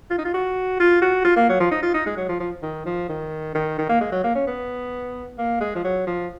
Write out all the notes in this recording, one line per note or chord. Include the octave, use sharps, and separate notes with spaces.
F4
D#4
F4
F#4
F4
F#4
F4
A#3
F#3
F3
D#4
F4
D#4
G#3
F#3
F3
F3
D#3
F3
D#3
D#3
D#3
A#3
G#3
F#3
A#3
C#4
B3
A#3
G#3
F3
F#3
F3